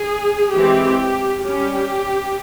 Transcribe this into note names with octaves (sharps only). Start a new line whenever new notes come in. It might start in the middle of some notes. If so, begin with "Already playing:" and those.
Already playing: G#4
E3 G#3 C4 G4
G3 C#4 G4